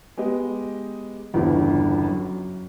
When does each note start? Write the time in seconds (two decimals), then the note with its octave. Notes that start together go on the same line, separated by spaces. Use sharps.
0.17 G#3 B3 G4 D#5
1.34 G1 E2 G2 C#3 E3 F3
2.06 F#2